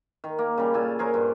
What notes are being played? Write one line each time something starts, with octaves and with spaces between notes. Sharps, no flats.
D#3
A#3
C#3 G3
A#2 A4 G#5
G#4 A#4 C5 C#5
G2